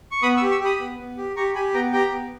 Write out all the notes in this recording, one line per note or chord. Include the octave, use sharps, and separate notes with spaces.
C#6
B3 B5 D#6
C#6 E6
G4
C#6 E6
G4 B5 D#6
B3
B3
G4
G4 A#5 C#6
G4 G#5 B5
B3 G5 A#5
G4 G5 A#5
B3